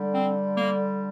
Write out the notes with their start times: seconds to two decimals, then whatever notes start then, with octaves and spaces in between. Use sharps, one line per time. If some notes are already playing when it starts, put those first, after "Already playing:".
Already playing: D3 G3
0.14 C4
0.57 A#3